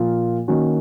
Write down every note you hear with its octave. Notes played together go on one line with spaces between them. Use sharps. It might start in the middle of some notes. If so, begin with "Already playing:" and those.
Already playing: A#2 F3 A#3 F4
D#3 A#3 C#4 F#4